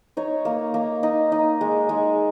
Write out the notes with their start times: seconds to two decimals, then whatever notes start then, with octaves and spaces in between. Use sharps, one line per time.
0.17 D#4 C#5
0.45 A#3
0.74 A#3
1.03 D#4
1.32 D#4
1.61 G#3
1.89 G#3